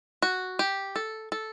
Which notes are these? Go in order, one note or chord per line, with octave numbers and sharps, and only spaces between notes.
F#4
G4
A4
A4